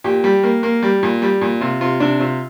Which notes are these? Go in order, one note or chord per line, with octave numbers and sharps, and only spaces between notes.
A#2 G4
G3
A#3
A#3
G3
A#2
G3
A#2
C3 F4
C3 F4
C3 D4
C3 F4